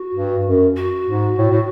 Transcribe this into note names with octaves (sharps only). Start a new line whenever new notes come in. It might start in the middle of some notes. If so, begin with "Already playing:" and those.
Already playing: F#4
G2
F#2
F#4
G#2
A2
A2